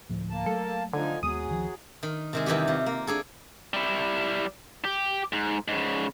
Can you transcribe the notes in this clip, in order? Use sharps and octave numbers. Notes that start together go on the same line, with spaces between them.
D2 A2 F3
A#3 A5
F#3 A3 A4
D3 F3 D#4 G#5
D#2 F#3 G#3 B3 G#4 D#6
D2 D#3 F3
D#3
C3 D#3 G#3
E2 D#3 E3 G3 G4
C3 F4
A#3
D4 G#4 A4
G3 E4
G4
G#2
G#2 C#3